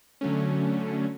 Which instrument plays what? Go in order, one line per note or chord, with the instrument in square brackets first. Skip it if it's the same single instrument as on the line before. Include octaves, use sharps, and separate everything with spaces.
[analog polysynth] D3 F#3 A3 C#4